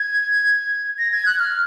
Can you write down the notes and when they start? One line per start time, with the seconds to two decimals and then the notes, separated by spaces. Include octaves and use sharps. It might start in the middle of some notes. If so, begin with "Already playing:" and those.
Already playing: G#6
0.99 A#6
1.12 G#6
1.26 F#6
1.39 F6